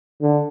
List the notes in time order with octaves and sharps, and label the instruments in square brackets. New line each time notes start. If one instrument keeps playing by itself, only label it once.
[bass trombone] D3